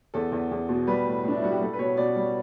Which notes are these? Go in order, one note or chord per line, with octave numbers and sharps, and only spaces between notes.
E2 A4
E2
E2
B2
G3 B4
A2
A2 D4
E4
G3 F#4
G4
G3 A4
B4
B2 C#5
B2 D5
G3